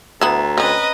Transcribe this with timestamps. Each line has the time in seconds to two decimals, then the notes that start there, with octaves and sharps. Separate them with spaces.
0.21 D2 B3 E4 A#5
0.58 C4 C#4 B4 D#5